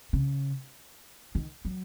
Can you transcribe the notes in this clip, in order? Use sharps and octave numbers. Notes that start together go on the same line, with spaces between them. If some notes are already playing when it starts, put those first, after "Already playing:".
C#3
D#3
F#3